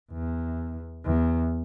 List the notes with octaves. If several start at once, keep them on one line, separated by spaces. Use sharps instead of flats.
E2
E2